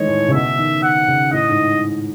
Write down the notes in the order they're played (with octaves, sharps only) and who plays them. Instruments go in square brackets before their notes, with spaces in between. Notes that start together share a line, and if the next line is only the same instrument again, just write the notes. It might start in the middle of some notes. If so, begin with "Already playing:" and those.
Already playing: [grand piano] D#3 E3 G#3 A3 [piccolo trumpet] C#5
[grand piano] A2
C#3
[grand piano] B2 [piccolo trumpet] E5
[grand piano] D#3
[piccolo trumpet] F#5
[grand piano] C#3
[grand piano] A2 [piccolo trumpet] D#5
[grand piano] G#2